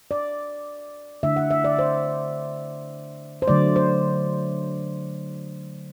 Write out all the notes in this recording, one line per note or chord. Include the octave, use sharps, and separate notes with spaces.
D5
D3 A3 D4 E5
F#5
E5
D5
C5
C5
D3 F#3 A3 D5
C5